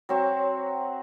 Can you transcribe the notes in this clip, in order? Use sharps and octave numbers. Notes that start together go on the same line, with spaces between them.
F#3 C4 F#4